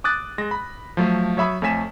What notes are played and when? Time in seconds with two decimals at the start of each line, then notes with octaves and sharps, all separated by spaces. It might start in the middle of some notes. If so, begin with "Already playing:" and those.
0.04 D6 D#6 F#6 A6
0.38 G#3 A#6
0.51 B5
0.97 F3 F#3 A3
1.37 F#3 C#5 E5 B5 D#6
1.62 F2 A3 C#5 G#5 B6 E7